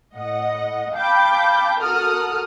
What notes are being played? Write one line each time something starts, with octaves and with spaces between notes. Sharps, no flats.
A2 D#5 F#5
F5 G5 A5 B5 D6 G6
F#4 A4 A#4 D#6 F6 F#6